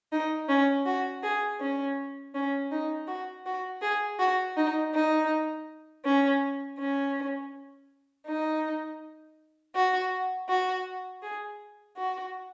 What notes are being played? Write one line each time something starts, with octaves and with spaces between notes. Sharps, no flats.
D#4
C#4
F#4
G#4
C#4
C#4
D#4
F#4
F#4
G#4
F#4
D#4
D#4
C#4
C#4
D#4
F#4
F#4
G#4
F#4